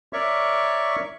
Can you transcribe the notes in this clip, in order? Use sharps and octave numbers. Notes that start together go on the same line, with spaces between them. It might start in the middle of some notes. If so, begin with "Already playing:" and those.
A#4 C#5 D5 E5 C#6